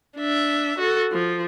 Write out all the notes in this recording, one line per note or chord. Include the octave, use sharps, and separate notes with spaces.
D4 E5
F#4 A4
F3